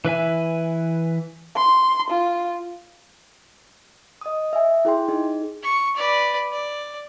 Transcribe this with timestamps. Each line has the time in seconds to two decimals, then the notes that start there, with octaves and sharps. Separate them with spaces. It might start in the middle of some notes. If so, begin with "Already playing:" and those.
0.05 E3 B4 E5 G#5
1.56 C6
2.10 F4
4.21 D#5 D#6
4.53 E5 G#5
4.85 E4 G#4 G5 C6
5.08 D#4 G#4
5.63 C#6
5.96 B4 D5
6.52 D5